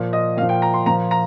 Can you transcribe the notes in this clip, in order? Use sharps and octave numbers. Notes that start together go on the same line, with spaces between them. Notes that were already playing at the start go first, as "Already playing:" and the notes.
Already playing: A#2 F3
D#5
A#2 F5
F3
G5
A#5
C6
A#2 F3 A#5
A#5